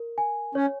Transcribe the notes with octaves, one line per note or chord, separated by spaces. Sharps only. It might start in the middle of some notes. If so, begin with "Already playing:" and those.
Already playing: A#4
G#5
C#4 C#5